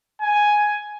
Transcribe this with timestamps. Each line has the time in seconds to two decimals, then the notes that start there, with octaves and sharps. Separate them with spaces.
0.22 G#5